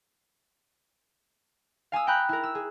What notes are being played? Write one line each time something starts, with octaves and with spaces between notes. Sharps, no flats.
F5 G#5 D#6 E6
G5 A#5 B5 F#6 G6
E4 A#4
E6
G#4